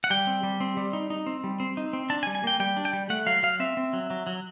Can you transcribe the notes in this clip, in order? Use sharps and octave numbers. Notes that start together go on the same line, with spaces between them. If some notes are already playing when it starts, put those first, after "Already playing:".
F#5
G3 G5
C4
G3
C4
G3
D#4
D#4
C4
G3
C4
D#4
C4
D4 A5
G#5
G3
G#5
A#3 G5
G3 G5
D4
G5
G3
A3 F#5
F#3 F5
F#3 F5
C4 E5
C4
F#3
F#3
F#3